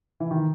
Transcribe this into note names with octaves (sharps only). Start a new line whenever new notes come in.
E3
D#3